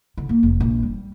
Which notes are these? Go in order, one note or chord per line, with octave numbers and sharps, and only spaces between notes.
D3
A#3
F1
A#1
G3